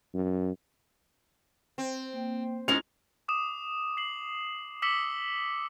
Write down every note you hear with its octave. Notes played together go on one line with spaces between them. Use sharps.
F#2
C4 C5
A#3 G5
G#2 G#3 C#4 E4 F4 F7
D6 D#6 E7
C7 F#7
D6 E6 B6 C#7 F#7 G7